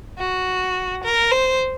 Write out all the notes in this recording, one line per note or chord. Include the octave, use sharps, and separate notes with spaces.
F#4
A#4
C5